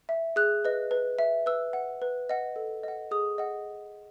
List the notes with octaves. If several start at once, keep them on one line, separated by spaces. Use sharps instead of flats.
E5
G#4 F#6
B4 D#5
B4
E5
B4 E6
F#5
B4
D#5 F#5
A4
D#5 F#5
G#4 D#6
D#5 F#5